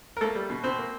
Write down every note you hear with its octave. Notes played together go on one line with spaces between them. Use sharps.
A#4
A3 A#3 A4
G3
B2
B2 C4 C5
A#3